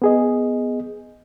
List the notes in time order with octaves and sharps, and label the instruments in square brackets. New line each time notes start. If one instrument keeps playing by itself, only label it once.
[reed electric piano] B3 G#4 D#5